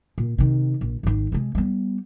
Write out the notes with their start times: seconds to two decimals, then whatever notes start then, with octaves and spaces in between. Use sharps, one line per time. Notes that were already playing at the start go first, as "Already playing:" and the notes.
0.18 A#2
0.38 C3 D#3
0.81 A#1
1.03 G#1 D#3
1.32 C3 G#3
1.55 G3 B3